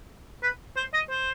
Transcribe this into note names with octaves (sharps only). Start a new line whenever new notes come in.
B4
C5
D#5
C5